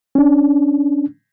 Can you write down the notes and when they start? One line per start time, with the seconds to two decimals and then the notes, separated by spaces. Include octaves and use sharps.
0.15 C#4 D4